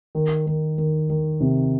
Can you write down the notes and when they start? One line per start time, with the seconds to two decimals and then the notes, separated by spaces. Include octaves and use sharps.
0.15 D#3
0.46 D#3
0.78 D#3
1.10 D#3
1.41 C3